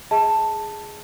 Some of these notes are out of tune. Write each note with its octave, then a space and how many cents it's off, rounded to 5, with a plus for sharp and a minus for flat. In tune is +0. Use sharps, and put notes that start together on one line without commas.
G#4 +0 D#5 +45 A5 +5